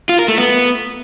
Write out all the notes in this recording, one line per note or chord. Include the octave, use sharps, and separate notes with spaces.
F4
A#4
A3
B3